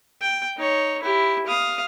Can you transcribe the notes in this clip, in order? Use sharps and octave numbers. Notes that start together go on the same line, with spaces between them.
G5
D#4 C#5
E4 G4
F5 D#6